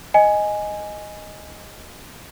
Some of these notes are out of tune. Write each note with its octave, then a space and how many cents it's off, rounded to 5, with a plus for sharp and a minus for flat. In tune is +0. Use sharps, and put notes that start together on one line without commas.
D#5 +0 G#5 +0